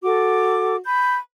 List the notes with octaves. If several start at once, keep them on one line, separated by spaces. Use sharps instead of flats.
F#4 A4 D6
B5 G6